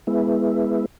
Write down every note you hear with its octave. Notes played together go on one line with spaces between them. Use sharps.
G#3 B3 E4